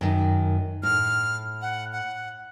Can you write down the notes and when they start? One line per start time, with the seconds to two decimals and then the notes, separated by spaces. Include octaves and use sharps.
0.01 F#2 D#3
0.83 A2 F6
1.62 F#5
1.93 F#5